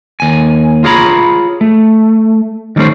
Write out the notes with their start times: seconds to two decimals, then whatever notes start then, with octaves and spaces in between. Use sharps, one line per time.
0.20 D#2 G#5
0.84 F4 G#4 C#5 A#5 B5
1.61 A3
2.76 D#3 G3 A3 C#4 C5